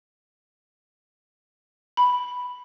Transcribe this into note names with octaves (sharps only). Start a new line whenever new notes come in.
B5